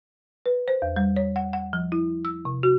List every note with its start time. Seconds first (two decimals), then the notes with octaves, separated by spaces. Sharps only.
0.46 B4
0.68 C5
0.82 E2
0.96 G3
1.16 C#5
1.36 F#5
1.53 F#5
1.73 F3
1.92 E4
2.25 E6
2.45 C3
2.63 F#4